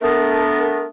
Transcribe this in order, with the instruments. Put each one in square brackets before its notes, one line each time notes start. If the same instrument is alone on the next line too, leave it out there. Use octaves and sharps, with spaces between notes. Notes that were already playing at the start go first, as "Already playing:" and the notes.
[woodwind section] A3 B3 D4 A#4